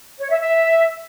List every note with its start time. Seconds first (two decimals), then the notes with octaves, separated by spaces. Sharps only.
0.20 C#5
0.30 E5
0.40 E5